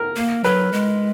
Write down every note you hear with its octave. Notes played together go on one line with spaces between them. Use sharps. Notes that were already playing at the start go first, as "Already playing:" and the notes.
Already playing: A#4
A#3
F#3 B4
G#3